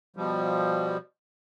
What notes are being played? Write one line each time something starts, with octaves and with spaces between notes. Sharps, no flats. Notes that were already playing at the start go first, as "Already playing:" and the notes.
B2 F3 G3